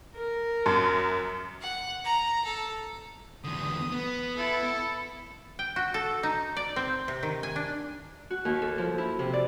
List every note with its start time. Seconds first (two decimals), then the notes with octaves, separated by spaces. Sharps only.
0.16 A#4
0.66 F#2
1.61 F#5
2.04 A#5
2.45 A4
3.44 E2 D3 D#6
3.92 B3
4.37 E4 A4
5.59 G5
5.76 F#4
5.94 A4
6.23 D#4
6.57 D5
6.76 C4
7.08 C3
7.23 D#3
7.43 G#5
7.56 D4
8.30 F#4
8.45 D#2
8.62 A4
8.78 F3
8.98 E4
9.19 C3
9.33 D5